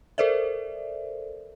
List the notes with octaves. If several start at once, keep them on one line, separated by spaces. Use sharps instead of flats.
A4 A#4 C5 D5 E5